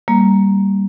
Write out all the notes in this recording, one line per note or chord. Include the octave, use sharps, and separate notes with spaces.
G3 A#3